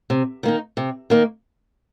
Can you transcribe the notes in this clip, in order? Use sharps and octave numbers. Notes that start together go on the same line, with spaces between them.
C3
D#3 A#3 D#4
C3
D#3 A#3 D#4